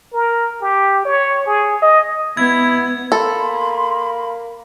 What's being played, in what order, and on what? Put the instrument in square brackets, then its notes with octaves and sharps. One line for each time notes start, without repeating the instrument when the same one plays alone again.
[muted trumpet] A#4
G4
C#5
G#4
D#5
[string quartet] B3 [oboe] E4 [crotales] G#6
[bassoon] A#3 [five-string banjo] A4 [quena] B5 [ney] C6